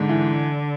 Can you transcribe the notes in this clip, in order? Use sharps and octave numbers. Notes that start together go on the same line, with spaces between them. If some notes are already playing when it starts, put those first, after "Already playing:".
Already playing: G#2 D3
E3